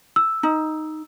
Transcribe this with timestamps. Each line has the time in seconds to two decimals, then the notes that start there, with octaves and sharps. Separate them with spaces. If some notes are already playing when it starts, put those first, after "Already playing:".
0.16 E6
0.43 D#4